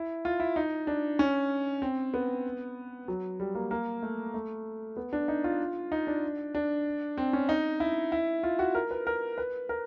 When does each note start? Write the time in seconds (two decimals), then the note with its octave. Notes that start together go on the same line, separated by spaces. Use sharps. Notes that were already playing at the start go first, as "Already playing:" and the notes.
Already playing: E4
0.25 F4
0.40 E4
0.56 D#4
0.87 D4
1.19 C#4
1.82 C4
2.14 B3
3.08 F#3
3.40 G3
3.55 A#3
3.71 A#3
4.03 A3
4.34 A3
4.97 B3
5.13 D4
5.28 D#4
5.44 F4
5.92 D#4
6.07 D4
6.55 D4
7.18 C4
7.33 C#4
7.49 D#4
7.80 E4
8.12 E4
8.43 F4
8.59 F#4
8.75 A#4
8.91 B4
9.07 A#4
9.38 B4
9.69 A#4